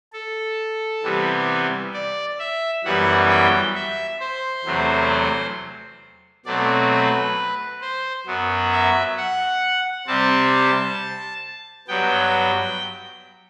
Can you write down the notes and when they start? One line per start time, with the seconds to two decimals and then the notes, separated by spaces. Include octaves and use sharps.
0.13 A4
1.03 C3 E3 G3 B3
1.94 D5
2.39 E5
2.84 F#2 E3 G3 B3 F#5
3.29 G5
3.75 E5
4.20 C5
4.65 E2 C3 F#3 A3
6.46 B2 F#3 A3 C4 D5
6.91 B4
7.81 C5
8.27 F#2 F#3 B3
8.71 E5
9.17 F#5
10.07 C3 G3 C4 A5
11.88 G2 F#3 B3 G5